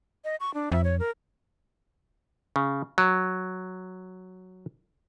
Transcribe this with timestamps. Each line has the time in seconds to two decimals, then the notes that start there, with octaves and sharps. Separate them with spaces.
0.25 D#5
0.40 C#6
0.54 D4
0.72 F2 E5
0.84 C#5
0.99 A#4
2.56 C#3
2.98 F#3